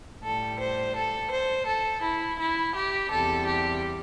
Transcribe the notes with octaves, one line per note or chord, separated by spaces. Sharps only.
A2 G3 A4
C5
A4
C5
A4
E4
E4
G4
E2 C3 G3 A4
G4